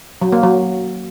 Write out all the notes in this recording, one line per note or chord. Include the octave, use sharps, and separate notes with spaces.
F#3
A#3
F#3